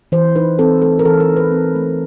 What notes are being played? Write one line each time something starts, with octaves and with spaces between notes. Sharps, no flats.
E3 C5
D#4 B4
C4 A4
A3 A4
A#4
E3 A4
A#4
D#4
B4
C4
A3